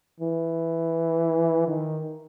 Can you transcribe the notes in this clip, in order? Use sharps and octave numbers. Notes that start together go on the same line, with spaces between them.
E3
D#3